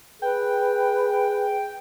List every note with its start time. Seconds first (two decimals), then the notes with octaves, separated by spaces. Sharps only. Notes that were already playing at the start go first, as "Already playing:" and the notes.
0.22 G#4 B4 G5